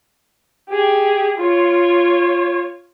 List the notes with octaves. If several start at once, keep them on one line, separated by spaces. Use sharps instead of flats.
G4 G#4
F4 C#5